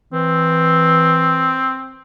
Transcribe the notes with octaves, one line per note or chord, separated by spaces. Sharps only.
E3 C4